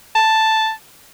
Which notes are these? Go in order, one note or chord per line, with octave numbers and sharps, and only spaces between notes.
A5